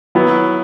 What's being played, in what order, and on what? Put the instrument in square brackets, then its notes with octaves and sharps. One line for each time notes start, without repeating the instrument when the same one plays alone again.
[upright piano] F#3 B3 E4